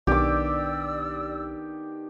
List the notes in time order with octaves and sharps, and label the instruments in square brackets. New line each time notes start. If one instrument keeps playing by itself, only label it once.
[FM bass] B1 [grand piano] D#3 B3 D4 [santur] G4 D6 [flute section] D5 E6